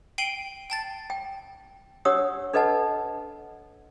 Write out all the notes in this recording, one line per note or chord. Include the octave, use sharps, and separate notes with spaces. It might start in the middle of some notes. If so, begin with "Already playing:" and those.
G5 C7 D7 D#7 F#7 G7
G5 A5 A6
G5
D4 G4 C#5 F#5 D#6 E6
D4 A4 B4 D#5 F#5 A5